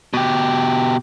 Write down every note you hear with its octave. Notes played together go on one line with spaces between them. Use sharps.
B2 G4